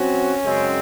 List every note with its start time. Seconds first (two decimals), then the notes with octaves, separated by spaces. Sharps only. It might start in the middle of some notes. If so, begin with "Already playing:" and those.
Already playing: F#3 C4 C#4 F#4
0.44 F#2 C#3 G#3 C4